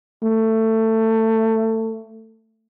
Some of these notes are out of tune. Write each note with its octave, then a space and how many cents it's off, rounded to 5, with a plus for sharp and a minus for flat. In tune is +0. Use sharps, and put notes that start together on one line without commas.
A3 +20